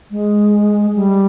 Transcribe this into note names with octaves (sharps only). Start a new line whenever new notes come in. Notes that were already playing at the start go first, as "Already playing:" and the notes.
G#3
G3